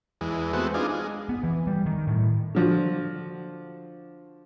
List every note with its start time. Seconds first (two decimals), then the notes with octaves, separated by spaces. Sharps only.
0.21 E2 G#3
0.53 G#3 A3 B3 C4 F#4
0.74 D4 D#4 F4 G#4
0.89 G#3
1.29 B3
1.44 E3
1.67 G3
1.86 D#3
2.07 A2
2.55 D3 F3 F#4